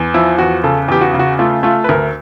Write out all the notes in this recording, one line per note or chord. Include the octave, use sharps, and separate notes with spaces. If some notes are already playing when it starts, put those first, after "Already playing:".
Already playing: E2
F3 E4
E2 F#4
C#3 A4
E2 G4
F#4
C#3
F#4
A3 F4
A3 F4
B4
D2 A#4